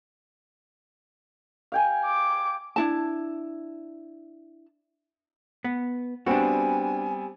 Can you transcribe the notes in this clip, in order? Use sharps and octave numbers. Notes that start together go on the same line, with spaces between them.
F5 G5 G#5
D6
D4 E4 A5
B3
G3 B3 C4 D4 F#4 G#5